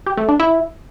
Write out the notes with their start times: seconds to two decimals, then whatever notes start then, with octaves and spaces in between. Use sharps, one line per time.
0.06 G4
0.17 A3
0.29 D4
0.40 E4